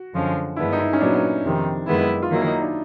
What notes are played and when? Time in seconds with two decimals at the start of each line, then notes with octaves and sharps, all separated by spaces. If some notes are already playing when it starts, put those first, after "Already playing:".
Already playing: F#4
0.14 F#2 D3 F3 G#3 C#4
0.56 G2 D#3 G#3 B3 D4 E4
0.73 D#4
0.79 E4
0.93 C#4
1.00 A#2 F#3 B3 D4
1.43 F2 C3 D#3
1.87 F#2 D#3 G#3 B3 E4
2.22 F4
2.31 D#3 F#3 A#3 E4
2.48 D#4
2.61 D4